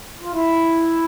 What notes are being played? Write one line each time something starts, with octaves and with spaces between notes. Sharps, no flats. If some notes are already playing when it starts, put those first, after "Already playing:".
F4
E4